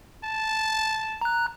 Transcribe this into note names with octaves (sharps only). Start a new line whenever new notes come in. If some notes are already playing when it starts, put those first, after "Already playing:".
A5
A#5 F#6